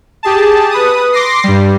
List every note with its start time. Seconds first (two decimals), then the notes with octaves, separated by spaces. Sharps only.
0.23 G4 G#4 A5
0.71 B4 D#6
1.13 C6 D6 A#6 C7
1.44 G2 G3